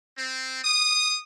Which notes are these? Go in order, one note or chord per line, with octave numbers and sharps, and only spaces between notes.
C4
D#6